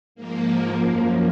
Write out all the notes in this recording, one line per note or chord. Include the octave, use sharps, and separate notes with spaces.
G#2 F3 A#3
F#2 F3